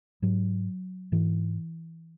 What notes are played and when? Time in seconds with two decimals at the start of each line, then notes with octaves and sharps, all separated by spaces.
0.22 G#2 F#3
1.12 G#2 E3